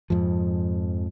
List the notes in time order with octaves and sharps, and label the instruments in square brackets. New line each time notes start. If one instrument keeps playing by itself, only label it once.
[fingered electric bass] F2 G#2 F3